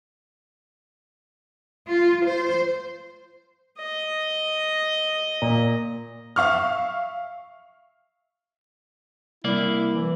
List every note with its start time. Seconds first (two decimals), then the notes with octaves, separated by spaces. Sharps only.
1.88 F4
2.26 C5
3.79 D#5
5.42 A#2
6.36 E5 F5 C#6 F6
9.44 C2 A#3 E4 D5
9.93 E3